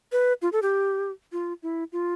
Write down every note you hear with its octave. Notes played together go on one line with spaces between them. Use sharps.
B4
F4
A4
G4
F4
E4
F4